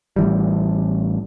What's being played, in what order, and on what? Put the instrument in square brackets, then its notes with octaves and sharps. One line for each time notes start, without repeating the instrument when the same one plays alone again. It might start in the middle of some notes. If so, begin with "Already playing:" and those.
[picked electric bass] A1 E3 G3